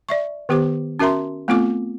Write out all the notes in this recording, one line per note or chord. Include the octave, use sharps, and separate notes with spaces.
D5 E5 C#6
D#3 B3 G4 C5 D6
C#4 F#4 A#4 E5 A#5 C6
A3 B3 C4 F4 A4 D6